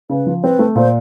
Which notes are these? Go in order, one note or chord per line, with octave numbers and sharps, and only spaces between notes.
C#3 B4
F3
C4 B4
A3
A#2 C5